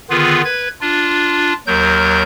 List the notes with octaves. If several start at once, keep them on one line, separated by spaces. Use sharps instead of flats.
D3 D#3 B3 F4 G#4 B4
B4 G#6
D4 F4
D#2 F#3 A#4 G6